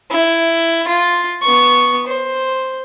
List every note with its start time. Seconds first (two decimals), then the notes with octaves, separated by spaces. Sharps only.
0.11 E4
0.88 F4
1.42 B3 C#6
2.07 C5